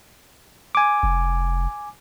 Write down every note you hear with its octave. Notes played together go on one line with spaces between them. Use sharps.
G#5 D6
F1